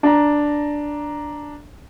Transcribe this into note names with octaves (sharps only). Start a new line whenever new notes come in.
D4 A#5